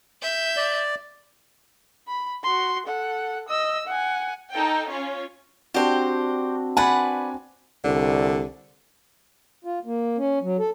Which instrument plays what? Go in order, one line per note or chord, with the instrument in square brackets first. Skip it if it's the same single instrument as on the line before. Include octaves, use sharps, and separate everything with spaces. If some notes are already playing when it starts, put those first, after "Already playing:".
[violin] E5 G6
[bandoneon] D5
[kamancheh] B5
F#4 C6
A4 F#5
D#5 E6
F#5 G#5
[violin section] D#4 A4 G5
C#4 F4 C#5
[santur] C4 D4 F#4 [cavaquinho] G4 C5 G5
[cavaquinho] B4 D5 F#5 [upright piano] G#5 B5
[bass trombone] C2 [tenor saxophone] D3
[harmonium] F4
A#3
C#4
F#3
A4